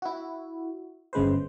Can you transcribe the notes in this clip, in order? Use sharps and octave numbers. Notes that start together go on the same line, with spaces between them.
E4 F#4
G1 C#3 G#3 B4 C5